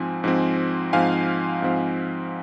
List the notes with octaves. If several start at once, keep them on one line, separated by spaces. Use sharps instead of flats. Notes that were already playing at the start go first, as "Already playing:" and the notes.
Already playing: G#2 F3 C4 G#5
G#2 F3 C4
G#2 F3 C4 F5 G#5
G#2 F3 C4